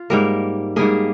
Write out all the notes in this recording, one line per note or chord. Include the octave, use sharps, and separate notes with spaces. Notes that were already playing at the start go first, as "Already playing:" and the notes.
Already playing: F4
G#2 G3 A#3 A#4
G#2 G3 A#3 G#4